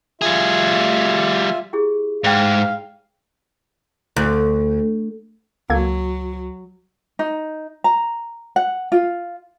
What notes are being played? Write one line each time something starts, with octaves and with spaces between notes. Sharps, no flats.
G3 F4 G#4 E5
E4 G4 G#4
G#2 D5 F5 G5
D2
C#2 F#3 A#3 A4 G#6
D#4
A#5
F#5
F4